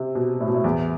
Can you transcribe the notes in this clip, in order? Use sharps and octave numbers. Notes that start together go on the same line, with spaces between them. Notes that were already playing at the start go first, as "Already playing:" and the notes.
Already playing: C3
B2
A2
B2
A2
E2